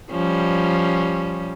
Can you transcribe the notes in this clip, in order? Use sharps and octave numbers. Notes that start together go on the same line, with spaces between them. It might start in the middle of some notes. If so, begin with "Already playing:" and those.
F3 G3 C#4